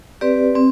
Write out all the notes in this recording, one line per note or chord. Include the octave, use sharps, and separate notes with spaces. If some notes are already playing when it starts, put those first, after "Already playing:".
C4 G4 B4 D5
C4